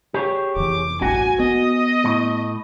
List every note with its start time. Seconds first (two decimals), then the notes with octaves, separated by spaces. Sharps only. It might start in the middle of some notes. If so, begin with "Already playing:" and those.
0.14 G4 G#4 C#5
0.56 F1 E3 D6
1.02 A1 G2 F#4 G#5
1.39 B3 D#5
2.05 A2